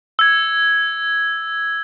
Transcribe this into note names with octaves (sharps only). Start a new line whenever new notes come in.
E6 G#6